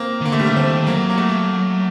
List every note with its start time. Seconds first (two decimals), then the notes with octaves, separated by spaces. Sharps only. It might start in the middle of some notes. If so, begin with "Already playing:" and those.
Already playing: A#3 C4
0.21 D#3
0.25 D3 A#3
0.32 A3
0.40 G3
0.46 D3 A3
0.56 C4
0.66 D#3
0.87 F#3 A#3
1.10 A#3
1.18 A3